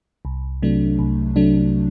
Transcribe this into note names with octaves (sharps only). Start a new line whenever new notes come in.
C2
C3 F#3 A3 D4
C2
C3 F#3 A3 D4